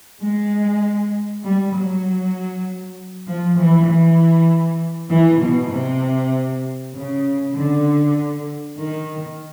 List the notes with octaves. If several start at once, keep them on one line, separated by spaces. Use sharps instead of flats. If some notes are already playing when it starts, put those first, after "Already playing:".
G#3
G3
F#3
F3
E3
E3
E3
B2
C3
C#3
D3
D#3